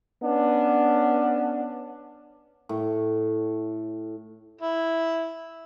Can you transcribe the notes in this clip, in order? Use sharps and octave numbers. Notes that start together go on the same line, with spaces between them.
B3 C#4 D4
A2
E4